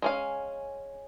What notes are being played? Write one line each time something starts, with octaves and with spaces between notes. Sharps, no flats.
G#3 C#4 F5